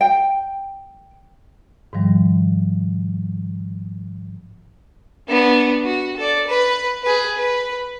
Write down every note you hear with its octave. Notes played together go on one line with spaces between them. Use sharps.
G5
G#2 D#3 F3 G3
B3 D4
F#4
A4 D5
B4
G#4 B4
B4